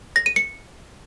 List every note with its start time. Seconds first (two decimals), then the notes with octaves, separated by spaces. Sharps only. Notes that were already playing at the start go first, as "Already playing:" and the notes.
0.16 A#6
0.26 D#7
0.36 C#7